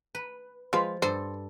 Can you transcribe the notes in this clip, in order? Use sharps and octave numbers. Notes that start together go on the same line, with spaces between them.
B4
F3 G#3 F4 B4
G2 A4 C5